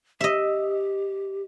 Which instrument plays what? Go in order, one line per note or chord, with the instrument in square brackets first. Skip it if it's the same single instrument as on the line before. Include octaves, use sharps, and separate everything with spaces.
[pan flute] G4 [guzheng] D#5 E5